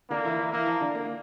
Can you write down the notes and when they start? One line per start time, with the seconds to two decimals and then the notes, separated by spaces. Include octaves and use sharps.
0.10 D3 A#3 D4
0.24 E3 E4
0.39 E3 E4
0.52 E3 A#3 E4
0.66 F3 F4
0.81 D3 D4
0.95 A#3
1.05 A#3